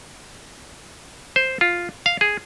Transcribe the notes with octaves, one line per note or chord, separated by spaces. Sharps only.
C5
F4
F5
G#4